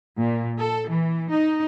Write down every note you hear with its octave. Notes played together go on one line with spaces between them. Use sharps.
A#2
A4
E3
D#4